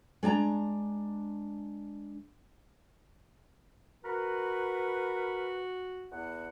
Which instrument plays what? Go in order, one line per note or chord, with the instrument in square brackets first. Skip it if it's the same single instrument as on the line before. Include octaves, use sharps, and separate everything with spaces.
[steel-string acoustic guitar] G#3 D4 G#5 A#5
[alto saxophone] F#4 [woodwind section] A#4 B4
[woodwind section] E2 F#5